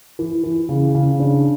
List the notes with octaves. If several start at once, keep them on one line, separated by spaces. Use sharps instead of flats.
E3
E3
C#3
C#3
D4